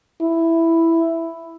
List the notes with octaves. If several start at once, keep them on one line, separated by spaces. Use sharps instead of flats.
E4